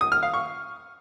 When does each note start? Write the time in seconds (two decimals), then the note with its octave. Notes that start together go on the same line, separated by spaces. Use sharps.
0.01 D#6
0.12 F6
0.23 F5
0.34 C#6